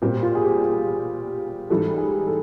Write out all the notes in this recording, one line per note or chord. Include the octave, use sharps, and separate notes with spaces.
A#2 G3 C4 G4
F4
G#4
G4
G#4
G#2 E3 G3 A4
G4
G#4
A4